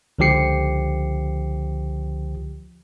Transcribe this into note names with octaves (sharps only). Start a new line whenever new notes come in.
C#2 D3 F3 G4 C7 C#7